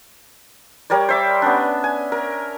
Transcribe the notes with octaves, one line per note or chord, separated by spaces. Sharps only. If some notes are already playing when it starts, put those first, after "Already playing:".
G3 A#4 C#5 D5
C5 E5 D6
B3 C#4 D4
G#5
A#4